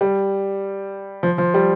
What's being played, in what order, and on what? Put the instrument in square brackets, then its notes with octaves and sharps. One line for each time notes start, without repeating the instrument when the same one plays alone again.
[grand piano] G3
F3
F3
G3